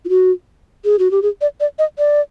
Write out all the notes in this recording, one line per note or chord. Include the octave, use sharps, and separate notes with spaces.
F4
F#4
G#4
F#4
G4
G#4
D5
D5
D#5
D5